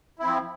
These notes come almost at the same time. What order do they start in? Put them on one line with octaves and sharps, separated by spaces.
E4 C4 F3